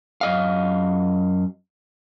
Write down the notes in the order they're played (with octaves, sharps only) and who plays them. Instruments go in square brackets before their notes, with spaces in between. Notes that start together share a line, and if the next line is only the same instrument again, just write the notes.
[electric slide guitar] F#2 D#5 F5